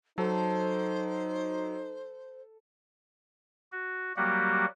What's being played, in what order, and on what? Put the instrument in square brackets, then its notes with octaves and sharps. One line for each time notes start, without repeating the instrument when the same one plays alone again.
[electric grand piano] F#3 [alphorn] D#4 [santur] A4 [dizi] C5
[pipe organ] F#4
F#3 G3 A#3 F#4 G4 F#5